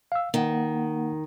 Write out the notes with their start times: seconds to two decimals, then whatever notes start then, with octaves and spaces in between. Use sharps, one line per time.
0.12 F5 E6
0.34 D#3 A#3 F#5